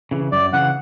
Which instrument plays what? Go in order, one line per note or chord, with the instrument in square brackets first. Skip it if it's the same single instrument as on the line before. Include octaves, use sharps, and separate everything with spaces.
[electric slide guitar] C#3 E3
[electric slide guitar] F#2 [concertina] D5
[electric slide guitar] C#3 E3 [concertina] F#5